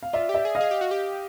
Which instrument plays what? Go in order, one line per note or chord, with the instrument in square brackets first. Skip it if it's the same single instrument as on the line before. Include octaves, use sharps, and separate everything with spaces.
[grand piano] F5
[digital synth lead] F4 [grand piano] D5 E5
[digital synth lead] G4
[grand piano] D5 E5
[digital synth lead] G#4
[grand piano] D#5 F5
[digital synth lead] G#4
G4
F#4
G4